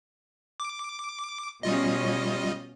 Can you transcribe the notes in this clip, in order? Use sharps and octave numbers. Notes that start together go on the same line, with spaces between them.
D6
B2 G3 C#4 F4 D#5